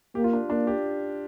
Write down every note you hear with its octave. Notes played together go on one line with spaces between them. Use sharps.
A#3 G4
F4
D4
A#3 D4
G4